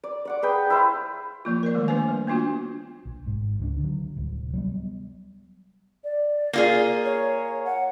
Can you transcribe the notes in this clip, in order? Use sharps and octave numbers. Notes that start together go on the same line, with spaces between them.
D5
D5 F#5 D6
G#4 B4 G5
E4 C5 F5
F3 A#3 F4
A#4 C#5 D5
D3 D#3 G#3 A3
A#3 D4 B4 C5 G#5
G3
A#3 B3 D4 F4 F#4
B1
G#1 G#2
C#2 G3 D4
D3 F#3
D1 C2
F#3 G3 B3
D5
A#3 F4 G#4
C#5
F#5